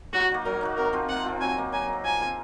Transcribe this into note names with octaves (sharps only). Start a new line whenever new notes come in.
F#3 F#4
A#3 D#4 F#4
F#3 A#4
A#3 D#4 F#4
C3 A#4
F3 C4 F4
C3 F#5
F3 C4 F4
F#3 G#5
A#3 D#4
F#3 G#5
A#3 D#4
F3 G#5
C4 F4 G#4